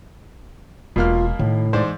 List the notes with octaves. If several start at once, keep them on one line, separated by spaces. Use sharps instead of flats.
E1 B2 A#3 F4 F6
A2 D#3
G#2 E3 C5 D5